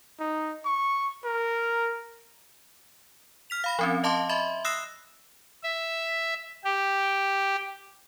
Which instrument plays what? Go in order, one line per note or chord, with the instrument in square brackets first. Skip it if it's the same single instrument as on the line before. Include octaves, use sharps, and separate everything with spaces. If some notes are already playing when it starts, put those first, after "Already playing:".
[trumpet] D#4
C#6
A#4
[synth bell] F6 B6 F7
F5 B5 A#6
F3 C4 C#4
D#5 F5 A5 C6 D6
D#5 E5 B5 C6
D#6 E6 F#6 A#6 C7 E7
[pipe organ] E5
G4